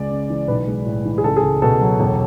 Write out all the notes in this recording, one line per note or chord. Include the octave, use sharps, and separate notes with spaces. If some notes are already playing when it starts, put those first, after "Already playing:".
Already playing: C#2 G#3 D5
C#3
E3
B1 B4
G#3
A2
E3
G#4
C#2 A4
G#4
C#2
B2 A4
F#3
E1